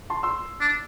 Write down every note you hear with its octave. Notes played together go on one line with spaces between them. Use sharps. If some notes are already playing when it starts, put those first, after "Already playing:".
A5 C6
C6 E6
D4